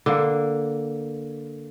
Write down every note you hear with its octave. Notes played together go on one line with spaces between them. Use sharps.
D3 A#3